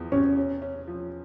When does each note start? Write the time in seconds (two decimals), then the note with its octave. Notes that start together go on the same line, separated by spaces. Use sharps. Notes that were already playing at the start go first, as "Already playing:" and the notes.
Already playing: E2 F3
0.12 C3 C#4
0.38 C#4
0.62 C#4
0.88 F3